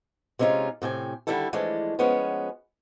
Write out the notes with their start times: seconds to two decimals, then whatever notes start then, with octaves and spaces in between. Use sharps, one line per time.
0.39 C3 G#3 C#4 D#4 F4
0.82 A2 C3 G5 G#5
1.27 D3 D#3 G3 D#4 E4 A4
1.53 E3 F3 G#3 A3 D4
1.99 F3 G#3 B3 C#4